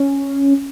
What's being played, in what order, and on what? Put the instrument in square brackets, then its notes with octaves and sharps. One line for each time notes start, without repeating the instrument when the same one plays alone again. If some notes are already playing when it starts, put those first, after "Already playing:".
Already playing: [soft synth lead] C#4